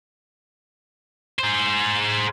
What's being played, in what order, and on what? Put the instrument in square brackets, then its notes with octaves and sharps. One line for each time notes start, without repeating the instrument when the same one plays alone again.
[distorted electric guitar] G#4 C5